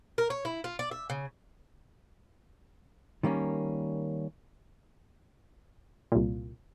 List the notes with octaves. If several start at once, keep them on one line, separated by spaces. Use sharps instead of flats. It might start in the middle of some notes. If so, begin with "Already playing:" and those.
A#4
C#5
E4
F4
D5
E5
C#3
D#3 G3 A#3 C#4
C2 A#2